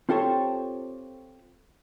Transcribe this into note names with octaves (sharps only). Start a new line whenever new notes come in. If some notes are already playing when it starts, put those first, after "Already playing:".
C4 F4 G4 A4 C5 C#5